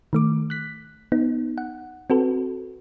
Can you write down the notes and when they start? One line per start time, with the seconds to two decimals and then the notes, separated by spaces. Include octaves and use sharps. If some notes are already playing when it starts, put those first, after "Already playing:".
0.13 D#3 A3 D6
0.50 F#6 B6
1.12 B3 D#4
1.58 F#5
2.10 C4 F#4 A4 B4